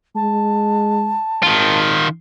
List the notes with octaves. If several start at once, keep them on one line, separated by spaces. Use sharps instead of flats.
G#3 A5
G#1 D#3 F4